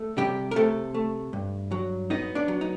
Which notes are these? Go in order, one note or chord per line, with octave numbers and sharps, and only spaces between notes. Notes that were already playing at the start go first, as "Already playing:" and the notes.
Already playing: A3
C3 G3 G4
A#4
C3 A3 A4
A3
G2
F#3
B3 D#4 D#5
D4 D5
F#3
D#4